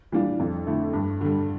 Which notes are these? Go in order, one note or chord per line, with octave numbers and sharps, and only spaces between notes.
E3 G3 D4 F4
F2
D3 A3 E4
G2
D3 G3